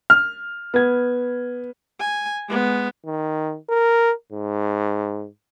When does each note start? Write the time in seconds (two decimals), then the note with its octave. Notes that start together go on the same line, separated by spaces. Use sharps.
0.10 F6
0.74 B3 G#6
2.00 G#5
2.49 G#3 B3
3.06 D#3
3.69 A#4
4.32 G#2